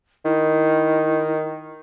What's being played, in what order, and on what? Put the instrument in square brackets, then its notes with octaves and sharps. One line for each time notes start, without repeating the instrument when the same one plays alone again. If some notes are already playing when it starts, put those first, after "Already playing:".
[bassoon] D#3 [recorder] E4